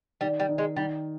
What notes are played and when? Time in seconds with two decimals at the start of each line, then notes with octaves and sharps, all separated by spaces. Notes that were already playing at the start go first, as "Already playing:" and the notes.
0.21 D#3 G3
0.40 G3
0.49 D#3
0.58 G#3
0.76 D#3 G3